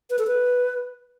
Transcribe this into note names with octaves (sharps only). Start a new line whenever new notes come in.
B4
A4
B4